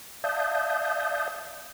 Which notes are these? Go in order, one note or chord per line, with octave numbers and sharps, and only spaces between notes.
D5 E5 F5 A5 D#6 G6